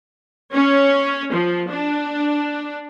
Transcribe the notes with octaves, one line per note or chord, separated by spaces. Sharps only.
C#4
F3
D4